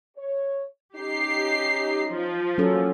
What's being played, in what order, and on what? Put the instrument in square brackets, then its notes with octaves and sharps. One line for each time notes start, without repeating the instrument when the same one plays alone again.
[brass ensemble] C#5
[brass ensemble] C#4 D#4 [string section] G4 C7
[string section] F3
[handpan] F#3 C#4 A4 [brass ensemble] A#3